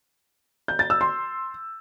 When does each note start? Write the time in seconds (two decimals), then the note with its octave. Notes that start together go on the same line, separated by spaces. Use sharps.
0.68 G6
0.79 A6
0.90 E6
1.01 C6